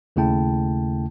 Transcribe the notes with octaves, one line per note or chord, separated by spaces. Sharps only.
D#2 C#3 A3 E4 G5 A5